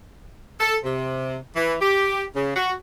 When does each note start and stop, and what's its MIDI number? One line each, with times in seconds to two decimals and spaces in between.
0.60 0.76 69
0.84 1.37 48
1.56 1.75 52
1.81 2.23 67
2.36 2.56 49
2.56 2.72 66